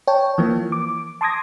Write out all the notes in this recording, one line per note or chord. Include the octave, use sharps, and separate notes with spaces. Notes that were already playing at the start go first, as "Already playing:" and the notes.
C#5 G5 A5
E3 F3 A#3
D6
A5 C6 D6 D#6 G#6 A#6